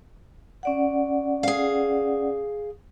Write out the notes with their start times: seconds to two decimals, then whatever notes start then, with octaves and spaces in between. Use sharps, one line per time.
0.63 C#4 D5 F#5
1.43 G#4 F5